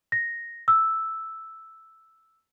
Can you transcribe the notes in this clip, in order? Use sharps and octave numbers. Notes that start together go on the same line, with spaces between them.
A#6
E6